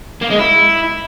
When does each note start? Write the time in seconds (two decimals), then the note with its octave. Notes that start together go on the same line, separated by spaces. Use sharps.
0.21 A#3
0.30 G#3
0.39 E4